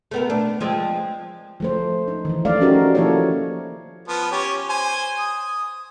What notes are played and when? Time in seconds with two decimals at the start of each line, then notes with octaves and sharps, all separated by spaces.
0.11 A3 B3 A#4
0.30 D4
0.60 F3 G#3 C4
1.60 F3 A3 C5
2.08 D#4
2.25 D#3 E3
2.45 F3 A3 D5 F5
2.60 C#4 D#4 F#4 G4 A#4
2.95 F3 A#3 E4 A4 A#4 C#5
4.08 F3 B3
4.32 C#4 G4 C#5
4.69 C5 G#5
5.19 D#6